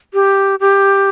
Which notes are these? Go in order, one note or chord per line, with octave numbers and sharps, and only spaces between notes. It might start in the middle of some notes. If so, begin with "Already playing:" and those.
G4
G4